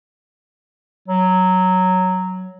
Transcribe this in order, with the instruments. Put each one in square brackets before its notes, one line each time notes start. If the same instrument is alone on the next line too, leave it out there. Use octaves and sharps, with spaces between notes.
[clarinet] F#3